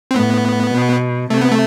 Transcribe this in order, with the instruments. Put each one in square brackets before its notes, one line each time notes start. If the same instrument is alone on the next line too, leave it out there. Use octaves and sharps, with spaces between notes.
[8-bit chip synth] C4
[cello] A2 [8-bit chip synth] B3
[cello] B2
[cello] C3 [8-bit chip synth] A3
[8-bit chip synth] B3
A3